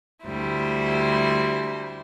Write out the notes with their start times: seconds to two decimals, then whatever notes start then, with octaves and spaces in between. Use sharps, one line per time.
0.25 D2 G3 E4 C5